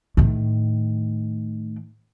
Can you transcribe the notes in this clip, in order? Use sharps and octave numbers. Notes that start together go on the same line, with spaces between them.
A2 D#3